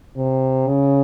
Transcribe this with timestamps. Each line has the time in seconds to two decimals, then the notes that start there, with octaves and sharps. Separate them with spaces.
0.17 C3
0.67 C#3